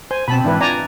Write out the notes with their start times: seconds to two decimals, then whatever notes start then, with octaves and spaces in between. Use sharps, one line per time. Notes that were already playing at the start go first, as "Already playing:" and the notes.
0.11 C5 G#5
0.28 B2 C4 A5 B5
0.44 G#2 E3 D4 E4 B4
0.61 D4 F4 D5 G#5 A#5